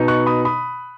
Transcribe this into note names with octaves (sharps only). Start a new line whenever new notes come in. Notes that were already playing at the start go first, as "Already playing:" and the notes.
Already playing: B2 B3 D#4
C#6 F#6
B5 D#6
B5 D#6